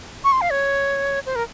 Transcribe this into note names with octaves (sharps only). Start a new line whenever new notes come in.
C#6
C6
F5
C#5
C5
A#4